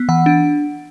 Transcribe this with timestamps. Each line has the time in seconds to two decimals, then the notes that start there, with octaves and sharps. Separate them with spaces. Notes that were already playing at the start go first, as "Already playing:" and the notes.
Already playing: B3
0.09 E3 F#5
0.26 D4